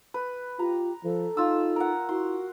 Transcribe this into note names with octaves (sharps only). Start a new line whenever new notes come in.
B4
F4 G4 A#5
F3 A4
D#4 F4 E6
A#4 F#5
E4 F#4 C6